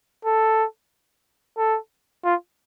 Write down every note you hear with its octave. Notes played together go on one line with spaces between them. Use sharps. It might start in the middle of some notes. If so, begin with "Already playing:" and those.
A4
A4
F4